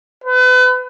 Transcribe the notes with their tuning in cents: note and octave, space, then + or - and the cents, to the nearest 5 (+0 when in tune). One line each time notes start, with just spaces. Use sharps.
B4 +35